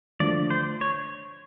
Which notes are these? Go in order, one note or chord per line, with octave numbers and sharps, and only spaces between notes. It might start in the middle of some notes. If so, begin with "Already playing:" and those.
D3 F3 A3 D5
C5
C#5